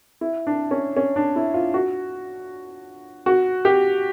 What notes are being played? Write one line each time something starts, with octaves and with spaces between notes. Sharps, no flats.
E4
D4
C#4
C#4
D4
E4
F4
F#4
F#4
G4